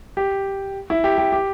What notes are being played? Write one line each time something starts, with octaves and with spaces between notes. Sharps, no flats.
G4
E4
G4
G4
G4